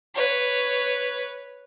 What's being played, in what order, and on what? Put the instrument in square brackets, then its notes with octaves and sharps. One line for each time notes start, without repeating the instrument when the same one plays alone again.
[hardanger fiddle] B4 C#5